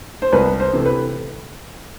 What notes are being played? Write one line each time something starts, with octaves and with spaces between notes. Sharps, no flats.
C5
C2 B4
C5
C3 E3 A3
B4